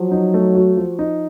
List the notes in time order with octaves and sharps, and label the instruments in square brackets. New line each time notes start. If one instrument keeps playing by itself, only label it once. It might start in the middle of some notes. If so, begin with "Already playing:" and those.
Already playing: [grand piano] F3 [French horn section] F#3
[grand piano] D#4
A3
F#4
F3
D#4